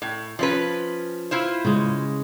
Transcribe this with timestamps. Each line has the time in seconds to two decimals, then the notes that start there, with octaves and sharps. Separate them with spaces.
0.02 A2
0.39 F3 C#4 B4
1.31 E4 F4 C5
1.65 C#3 G#3